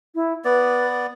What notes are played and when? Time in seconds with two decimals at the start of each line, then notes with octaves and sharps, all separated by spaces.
0.15 E4
0.45 B3 B4 D5